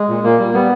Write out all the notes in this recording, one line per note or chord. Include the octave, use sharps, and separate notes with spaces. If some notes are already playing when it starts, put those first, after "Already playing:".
Already playing: G#3
A#2
A#2 A#3
G3
G3 B3